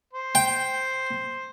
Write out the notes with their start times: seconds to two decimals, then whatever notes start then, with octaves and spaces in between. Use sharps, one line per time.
0.13 C5
0.35 G5